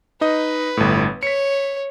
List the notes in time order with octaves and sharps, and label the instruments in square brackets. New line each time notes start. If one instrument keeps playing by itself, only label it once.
[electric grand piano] D#4 D#5 [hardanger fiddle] B4
[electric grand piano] G1 A2
[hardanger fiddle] C#5 [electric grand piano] B6 C#7